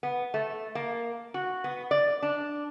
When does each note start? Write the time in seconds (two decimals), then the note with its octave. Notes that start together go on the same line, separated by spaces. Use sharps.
0.03 B3
0.34 A3
0.75 A#3
1.34 F#4
1.64 B3
1.91 D5
2.22 D4